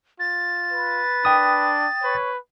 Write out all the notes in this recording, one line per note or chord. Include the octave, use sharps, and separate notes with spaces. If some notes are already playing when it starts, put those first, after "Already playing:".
F4 A6
B4
D4 G5 D#6
B4 C#5